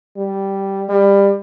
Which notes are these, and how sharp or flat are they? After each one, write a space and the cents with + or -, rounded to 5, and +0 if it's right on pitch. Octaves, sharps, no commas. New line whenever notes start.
G3 -5
G3 +20